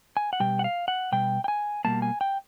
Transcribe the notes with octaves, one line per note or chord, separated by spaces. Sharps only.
G#5
F#5
B2 G3 G5
F#5
F5
F#5
B2 G3 G5
G5
G#5
B2 G3 A#3 A5
G#5
G5